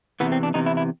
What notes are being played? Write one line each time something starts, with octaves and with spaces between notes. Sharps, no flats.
E2 C3 E3 B3
C4
D4
E2 C3 E3 D#4
E4
E4